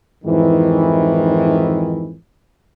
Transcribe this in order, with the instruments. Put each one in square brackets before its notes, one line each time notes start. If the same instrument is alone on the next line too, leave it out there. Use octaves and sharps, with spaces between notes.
[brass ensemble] F2 G#2 D#3 E3